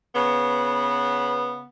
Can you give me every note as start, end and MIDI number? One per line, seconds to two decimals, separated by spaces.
0.14 1.66 49
0.14 1.66 59